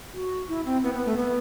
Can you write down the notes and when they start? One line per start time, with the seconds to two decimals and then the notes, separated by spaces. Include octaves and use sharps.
0.14 F#4
0.49 E4
0.66 C4
0.83 B3
0.94 B3
1.06 A3
1.17 B3